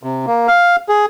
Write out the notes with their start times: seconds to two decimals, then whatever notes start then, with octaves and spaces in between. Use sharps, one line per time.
0.03 C3
0.27 A#3
0.48 F5
0.89 G#4